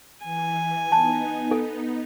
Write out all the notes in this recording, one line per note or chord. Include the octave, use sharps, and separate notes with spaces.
E3 G#5
B3 D#4 A5
A4